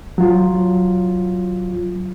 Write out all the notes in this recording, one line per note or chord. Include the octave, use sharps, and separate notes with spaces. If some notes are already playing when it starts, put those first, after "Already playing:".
F#3 F4